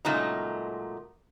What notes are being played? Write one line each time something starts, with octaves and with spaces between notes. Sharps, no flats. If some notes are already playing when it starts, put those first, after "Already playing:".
A#2 C#3 F#3 G#3 A3 D#4